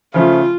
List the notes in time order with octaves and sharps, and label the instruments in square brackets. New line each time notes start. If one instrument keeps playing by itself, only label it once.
[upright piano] C#3 F3 A3 [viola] F4